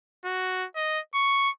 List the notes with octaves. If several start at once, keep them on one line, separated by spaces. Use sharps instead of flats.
F#4
D#5
C#6